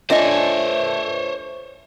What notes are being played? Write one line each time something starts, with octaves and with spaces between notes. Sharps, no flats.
A3 D4 F4 C5 C#5 D#5 G#5